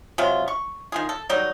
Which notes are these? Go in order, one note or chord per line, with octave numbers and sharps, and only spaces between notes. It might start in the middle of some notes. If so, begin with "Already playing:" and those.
C3 F#3 G#3 F4
C#6
D#3 F4 G#4
A4
D#3 F#3 G3 D#4